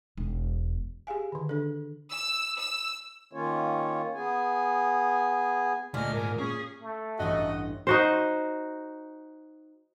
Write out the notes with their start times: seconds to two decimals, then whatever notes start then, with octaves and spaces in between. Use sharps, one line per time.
0.17 E1
1.07 G4 G#4 F5 G#5
1.32 D3 D#3
1.49 D4 A4
2.11 E6
2.60 E6
3.33 D#3 A#3 C#4 F4 C#5
4.14 B3 G#4 G#5
5.94 D2 A#2 A3 D#5 G#5 F6
6.14 G#2 A#4 G#5
6.39 C#4 G#4
6.82 A3
7.19 A1 G2 F#4 D#5
7.87 D#4 F#4 C5